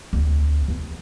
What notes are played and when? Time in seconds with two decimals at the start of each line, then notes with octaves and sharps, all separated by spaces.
0.13 D2 C4
0.68 E2